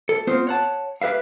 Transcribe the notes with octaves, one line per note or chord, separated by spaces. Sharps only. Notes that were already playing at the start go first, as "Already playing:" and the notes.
A4
B3 C4 F4 C5
C#5 F#5 A5
G4 B4 E5 F5